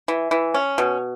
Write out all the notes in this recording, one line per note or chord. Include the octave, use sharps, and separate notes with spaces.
E3
E3
C#4
B2